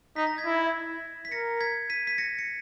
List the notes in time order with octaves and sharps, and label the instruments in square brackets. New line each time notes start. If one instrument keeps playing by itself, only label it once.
[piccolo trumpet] D#4 [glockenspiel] B6
[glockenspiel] A#6
G#6 B6
[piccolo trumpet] E4
[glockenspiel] B6
[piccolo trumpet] A#4 [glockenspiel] A#6 C#7
[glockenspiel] G#6 B6
B6 D#7
B6
A#6 C#7
C#7